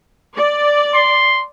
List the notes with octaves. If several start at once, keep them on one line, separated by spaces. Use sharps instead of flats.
D5
C6